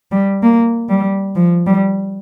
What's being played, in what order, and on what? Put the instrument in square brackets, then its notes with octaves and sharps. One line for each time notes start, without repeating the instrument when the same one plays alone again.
[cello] G3
A#3
G3
F3
G3